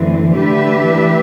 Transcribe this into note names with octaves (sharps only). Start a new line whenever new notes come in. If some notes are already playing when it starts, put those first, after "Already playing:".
Already playing: F#2 D3 E3 A3 C4
D3 A3 D4 G4 B4 E5
E3